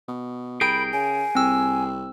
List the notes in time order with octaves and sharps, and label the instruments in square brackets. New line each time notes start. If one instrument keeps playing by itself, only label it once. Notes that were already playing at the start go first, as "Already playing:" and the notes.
[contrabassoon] B2
[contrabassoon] C2 [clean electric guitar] G#4 A#4 G5 [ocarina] B5 [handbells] G6
[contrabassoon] C#3 [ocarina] G#5
[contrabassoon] C2 [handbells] C4 E6